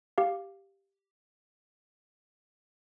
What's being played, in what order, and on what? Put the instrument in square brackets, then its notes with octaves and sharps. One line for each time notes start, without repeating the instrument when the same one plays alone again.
[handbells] G4 F5